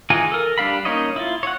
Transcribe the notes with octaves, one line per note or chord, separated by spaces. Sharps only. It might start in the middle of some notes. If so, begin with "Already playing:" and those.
E3 D#4 F4 G#4 G#5
A4 A#4
G3 D4 F5 B5
A#3 C#4 D#4 C#5 D#5
E4 F4
C#5 F#5